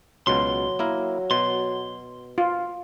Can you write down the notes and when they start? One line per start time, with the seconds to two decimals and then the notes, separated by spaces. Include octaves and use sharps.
0.27 C#2 B2 F#3 F5 C6
0.79 A#3 E4 A#4
1.31 B2 C6
2.38 F4